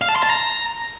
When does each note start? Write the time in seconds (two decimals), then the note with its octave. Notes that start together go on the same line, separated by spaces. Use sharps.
0.02 F5
0.09 A5
0.16 C6
0.23 A5
0.30 A#5